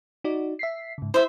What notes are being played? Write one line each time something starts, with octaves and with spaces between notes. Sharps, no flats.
D#4 F#4 D5
E5 B6 C7
G#2 C#3
E4 C5 E5